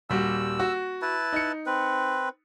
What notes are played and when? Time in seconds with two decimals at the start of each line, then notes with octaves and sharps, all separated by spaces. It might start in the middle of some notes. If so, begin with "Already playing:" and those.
0.10 D#1 G3 F#4 E6
0.59 F#4
1.02 E4 B4 A5
1.33 D#4 C#7
1.66 C4 B4